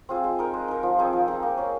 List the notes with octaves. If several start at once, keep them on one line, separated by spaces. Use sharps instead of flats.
C4 F4 G#4
G#3
D#4 A#4
G#3
D#4 A#4
F3
C4 D#4 G#4
F3
C4 D#4 G#4
A#3
C#4 G#4